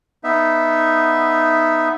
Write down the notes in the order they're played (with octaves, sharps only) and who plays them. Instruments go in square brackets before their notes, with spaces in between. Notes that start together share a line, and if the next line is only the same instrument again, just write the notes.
[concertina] B3 D#4 E5